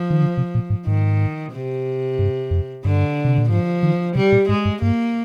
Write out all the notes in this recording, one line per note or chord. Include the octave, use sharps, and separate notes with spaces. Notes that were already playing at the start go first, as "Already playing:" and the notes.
Already playing: F3
D#3
D3
C3
A#2
G#2
G#2 D#3
C3
G2
F2
G2 D3
C3
A#2
G#2 F3
D#3
C3 G3
A#2
G#2 G#3
G2
G2 A#3